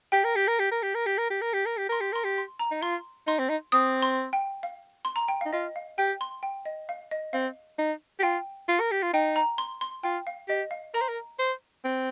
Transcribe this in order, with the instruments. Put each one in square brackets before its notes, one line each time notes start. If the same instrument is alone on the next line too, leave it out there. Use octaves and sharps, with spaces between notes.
[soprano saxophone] G4 [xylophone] G5
[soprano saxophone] A#4
G4
A#4
G4
A#4
G4
A#4
G4
A#4
G4
A#4
G4
A#4
G4
[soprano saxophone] A#4 [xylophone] C6
[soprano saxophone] G4
[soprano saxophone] A#4 [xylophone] C6
[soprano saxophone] G4
[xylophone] C6
A#5
[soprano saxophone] D#4
[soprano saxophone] F4 [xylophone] C6
[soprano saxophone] D#4 [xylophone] C6
[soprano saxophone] C4
D#4
[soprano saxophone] C4 [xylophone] D#6
[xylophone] C6
G5
F5
C6
A#5
G5
[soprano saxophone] D#4 [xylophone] F5
[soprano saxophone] F4 [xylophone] D#5
[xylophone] F5
[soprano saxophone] G4 [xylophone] G5
[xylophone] C6
G5
D#5
F5
D#5
[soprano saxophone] C4 [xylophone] F5
[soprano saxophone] D#4
G4
[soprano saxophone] F4 [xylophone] G5
[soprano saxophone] F4
A#4
G4
F4
[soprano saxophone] D#4 [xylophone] G5
[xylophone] A#5
C6
C6
[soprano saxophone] F4 [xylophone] G5
[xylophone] F5
[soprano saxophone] G4 [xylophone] D#5
[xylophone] F5
[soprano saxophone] A#4 [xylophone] A#5
[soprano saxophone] C5
A#4
C5
C4